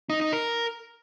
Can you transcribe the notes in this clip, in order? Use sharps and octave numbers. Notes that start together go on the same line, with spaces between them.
D#4
D#4
A#4